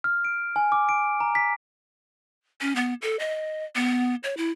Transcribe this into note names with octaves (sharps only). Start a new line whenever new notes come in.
F6
D7
G#5
D6
D7
A#5
B6
C#4
B3
A4
D#5
B3
C#5
E4